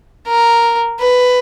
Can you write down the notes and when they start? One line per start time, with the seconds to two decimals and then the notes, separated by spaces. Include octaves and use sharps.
0.27 A#4
0.99 B4